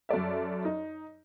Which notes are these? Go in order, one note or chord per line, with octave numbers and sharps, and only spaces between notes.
F#2 A4 D5 E5
D#4